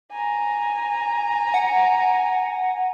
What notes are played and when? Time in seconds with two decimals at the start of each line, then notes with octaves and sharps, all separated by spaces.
0.12 G#5 A#5
1.54 F#5